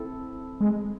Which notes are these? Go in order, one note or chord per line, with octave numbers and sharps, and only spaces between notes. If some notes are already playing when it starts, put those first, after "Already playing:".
Already playing: C4 E4 A4
G#3